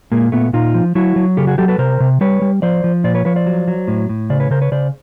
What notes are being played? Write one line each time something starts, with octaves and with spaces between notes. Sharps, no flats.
A#2 G#3 A#3
A#2 A3 B3
A#2 D#4 F4
F3
F#3 E4 F#4
F#3
C#3 G4 A4
F#4 G#4
F#3 G4 A4
A4 B4
C3 A#4 C5
C3
G3 B4 C#5
G3
F3 C5 D5
F3
A#2 C5 D5
B4 C#5
F3 B4 C#5
C5 D5
F#3
F#3
A2
A2
C#3 C5 D5
B4 C#5
C#3 A#4 C5
B4 C#5
C#3 C5 D5